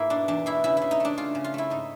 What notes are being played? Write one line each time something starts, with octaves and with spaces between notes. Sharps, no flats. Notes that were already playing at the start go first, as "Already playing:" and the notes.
Already playing: G#2 A#3 E4
B2 D4
E2 D4
B2 E4
C#3 E4
C#3 E4
D#4
A3 D4
C#3 F4
C#3
F4
A3 E4
G#2 D#4